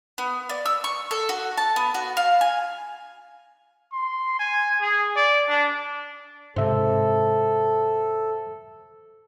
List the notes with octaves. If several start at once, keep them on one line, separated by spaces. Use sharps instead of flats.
B3
D5
E6
C#6
A4
F#4
A5
B3
F#4
F5
G#5
C6
G#5
G#4
D5
D4
G#2 C3 A4 C5 E5